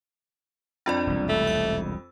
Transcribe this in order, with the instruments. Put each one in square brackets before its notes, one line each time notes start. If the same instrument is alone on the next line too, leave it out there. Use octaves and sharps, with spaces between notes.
[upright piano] F2 B5 A6 [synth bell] D4 F4 D5
[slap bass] E1 C2
[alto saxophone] A3
[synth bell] E6